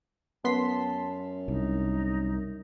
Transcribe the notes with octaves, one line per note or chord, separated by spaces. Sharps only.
F#2 B3 A5 C6 B6
C2 D#4